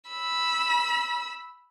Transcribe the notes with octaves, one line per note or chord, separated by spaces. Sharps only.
B5 E6